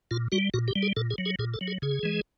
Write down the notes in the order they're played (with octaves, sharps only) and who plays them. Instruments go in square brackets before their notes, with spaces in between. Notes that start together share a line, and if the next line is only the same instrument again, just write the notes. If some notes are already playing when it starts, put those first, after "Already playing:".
[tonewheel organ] A#2 F4
G3 F#4
A#2 F#4
G4
G3
G#4
A#2 A4
G#4
F#3
G#4
A#2 G#4
A4
F#3
G#4
C#3 G#4
E3 G#3